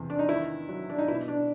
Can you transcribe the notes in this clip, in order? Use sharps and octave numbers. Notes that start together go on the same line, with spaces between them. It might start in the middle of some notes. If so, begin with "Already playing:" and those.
Already playing: E2 C3
D4
D#4
D#3 E4
F#3
D4
D#4
B2 E4
D4